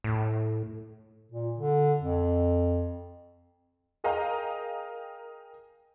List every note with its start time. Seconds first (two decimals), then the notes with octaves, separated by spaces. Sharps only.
0.04 A2
1.32 A#2
1.57 D3
2.00 F2
4.04 G#4 A#4 D#5 F5 G5 A#5